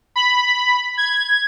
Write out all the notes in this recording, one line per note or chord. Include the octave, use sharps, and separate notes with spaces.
B5
G#6